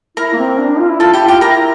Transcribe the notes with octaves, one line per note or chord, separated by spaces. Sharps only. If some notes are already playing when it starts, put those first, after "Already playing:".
E4 A#4 A#5
A#3
C4
D4
D4
F4
E4
F4 A4 A5
E4 G4 G5
F4 G4 G5
E4 A#4 A#5